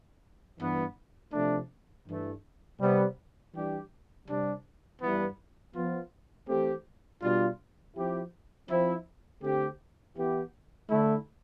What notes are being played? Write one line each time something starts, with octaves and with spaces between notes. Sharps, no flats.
G2 E3 B3
C3 F3 A3 D4
G2 E3 A3
C3 G3 B3
E3 G3 D4 G4
C3 G3 D4
G2 E3 B3
F3 B3 F4
E3 A3 C4 G4
B2 G3 D4 F4
F3 C4 E4 G4
F3 C4 E4
D3 A3 C4 G4
E3 B3 E4 G4
D3 A3 E4